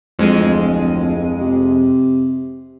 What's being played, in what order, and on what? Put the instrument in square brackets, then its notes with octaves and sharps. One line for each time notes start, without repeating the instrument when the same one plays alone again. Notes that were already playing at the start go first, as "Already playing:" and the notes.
[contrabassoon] D1 [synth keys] F2 G#3 D#7
[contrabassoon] C3